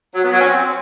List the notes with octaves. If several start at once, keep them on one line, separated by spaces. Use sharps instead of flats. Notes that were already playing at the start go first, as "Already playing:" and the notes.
F#3
B3
F#3
C#4
C4